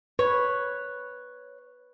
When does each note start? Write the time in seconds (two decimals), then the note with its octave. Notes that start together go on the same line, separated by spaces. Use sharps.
0.19 B4 C#5